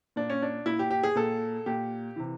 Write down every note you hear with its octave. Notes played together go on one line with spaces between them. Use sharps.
A#2 D4
C#4
D4
A#2 E4
G4
G4
G#4
A#2 A4
A#2 G4
C3 E3